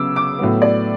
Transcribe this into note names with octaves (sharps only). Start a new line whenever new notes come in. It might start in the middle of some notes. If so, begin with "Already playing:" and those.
Already playing: C#3 F#3 B3 D6 E6
D6
A2 F#3 B3
D5